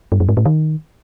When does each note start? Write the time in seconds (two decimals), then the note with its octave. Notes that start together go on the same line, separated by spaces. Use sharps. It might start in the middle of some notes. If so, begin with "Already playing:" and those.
0.12 G2
0.20 F#2
0.29 G#2
0.37 A2
0.45 D#3